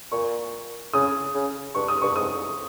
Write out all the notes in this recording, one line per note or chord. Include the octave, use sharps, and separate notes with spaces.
A#2 C#6
C#3 D#6
C#3
G2 C#6
D#6
G2 C#6
G#2 D#6